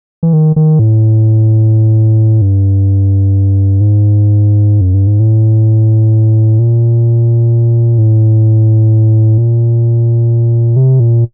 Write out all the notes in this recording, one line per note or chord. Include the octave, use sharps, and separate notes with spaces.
E3
D#3
D#3
A2
G2
G#2
F#2
G2
G#2
A2
A#2
A2
A#2
C3
A#2